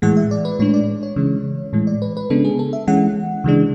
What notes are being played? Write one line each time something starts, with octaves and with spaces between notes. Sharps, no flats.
A2 E3 G#3 F#5
E5
D5
B4
A2 G#3 D4 C#5
D5
C#5
C#3 E3 G#3
A2 E3 G#3
D5
B4
B4
C#3 G#3 B3 D4 A4
G#4
A4
E5
E3 G#3 C#4 F#5
C#3 E3 G#3 D4